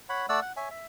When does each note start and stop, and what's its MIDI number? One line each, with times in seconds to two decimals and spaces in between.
0.09 0.26 73
0.09 0.26 78
0.09 0.26 83
0.29 0.40 57
0.29 0.40 74
0.29 0.40 78
0.29 0.40 88
0.42 0.52 78
0.57 0.69 73
0.57 0.69 76
0.57 0.69 80
0.71 0.86 76